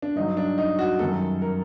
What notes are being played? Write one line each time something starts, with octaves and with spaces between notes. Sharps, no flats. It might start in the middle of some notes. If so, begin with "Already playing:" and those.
D4
G2 F#3 D#4
D4
D#4
F#4
F#2 D#3 G3 A4
A#4